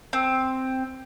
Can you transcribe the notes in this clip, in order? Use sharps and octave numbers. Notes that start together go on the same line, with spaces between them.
C4